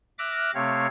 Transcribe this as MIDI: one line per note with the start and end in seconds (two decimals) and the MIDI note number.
0.19 0.51 76
0.19 0.51 86
0.19 0.51 89
0.19 0.51 90
0.19 0.51 94
0.54 0.87 48
0.54 0.87 57
0.54 0.87 60
0.54 0.87 73
0.54 0.87 77